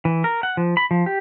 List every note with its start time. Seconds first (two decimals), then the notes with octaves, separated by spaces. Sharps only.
0.05 E3
0.24 A#4
0.43 F#5
0.57 F3
0.77 B5
0.91 F3
1.06 G4